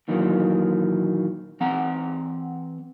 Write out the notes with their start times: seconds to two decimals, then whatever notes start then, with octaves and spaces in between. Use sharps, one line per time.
0.08 A#2 D#3 E3 F#3 A#3
1.60 E3 C4 F#5 A#5